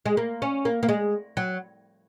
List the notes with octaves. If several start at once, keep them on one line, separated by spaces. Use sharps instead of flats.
G#3
A#3
C#4
A#3
A#3
G#3
F#3